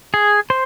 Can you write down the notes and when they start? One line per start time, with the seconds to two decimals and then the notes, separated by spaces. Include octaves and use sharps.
0.14 G#4
0.50 C5